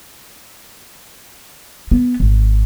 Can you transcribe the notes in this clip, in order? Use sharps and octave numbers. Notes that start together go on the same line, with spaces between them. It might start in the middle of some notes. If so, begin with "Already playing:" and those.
B3
G#1